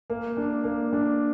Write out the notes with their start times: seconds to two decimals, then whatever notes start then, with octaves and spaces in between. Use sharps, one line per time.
0.10 A#3
0.37 D4
0.64 A#3
0.93 D4